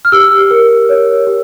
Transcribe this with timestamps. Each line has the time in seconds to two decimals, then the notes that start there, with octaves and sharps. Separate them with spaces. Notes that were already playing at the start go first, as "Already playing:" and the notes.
0.05 F6
0.12 G4 E6
0.50 A#4
0.89 C#5
1.27 G4